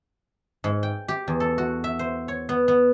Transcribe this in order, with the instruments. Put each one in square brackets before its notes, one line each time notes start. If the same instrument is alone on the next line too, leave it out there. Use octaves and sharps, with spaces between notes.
[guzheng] G#2
G5
G4
E2
A4
F#4
E5
C5
C#5
B3
B3